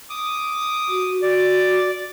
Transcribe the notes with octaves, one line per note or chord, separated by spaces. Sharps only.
D6 D#6
F#4
F#4 D5